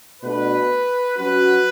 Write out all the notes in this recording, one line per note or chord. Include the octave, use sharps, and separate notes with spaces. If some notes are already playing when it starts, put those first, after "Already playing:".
B2 A3 D4 F#4 B4
F#3 C#4 F#4 B4